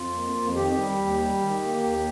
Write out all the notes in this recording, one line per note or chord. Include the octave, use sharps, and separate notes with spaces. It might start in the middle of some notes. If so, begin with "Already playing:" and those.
Already playing: F2 F4
A#3
F2
D#3 G4
G3
D#2
G3
D#3
A#3
D#2